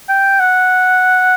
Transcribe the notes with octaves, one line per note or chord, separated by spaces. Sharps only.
G5
F#5